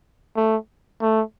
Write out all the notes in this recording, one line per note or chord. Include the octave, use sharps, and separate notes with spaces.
A3
A3